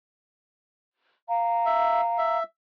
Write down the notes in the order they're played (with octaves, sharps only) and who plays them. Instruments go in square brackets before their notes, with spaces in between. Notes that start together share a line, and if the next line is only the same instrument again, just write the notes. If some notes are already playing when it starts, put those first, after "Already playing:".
[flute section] F5 A#5
[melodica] E5
E5